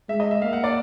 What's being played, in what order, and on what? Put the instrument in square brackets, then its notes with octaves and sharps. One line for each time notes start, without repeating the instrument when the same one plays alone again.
[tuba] G#3 [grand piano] E5
[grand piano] D#5
E5
[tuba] A#3 [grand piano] F5
[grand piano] F#5
D5